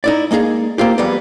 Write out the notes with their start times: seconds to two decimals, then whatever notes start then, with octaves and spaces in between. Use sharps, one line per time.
0.04 D#4 E4 D5
0.31 G#3 A#3 D#4 G#4
0.78 A#3 C4 F4 G4
0.98 F2 G3 G#3 B3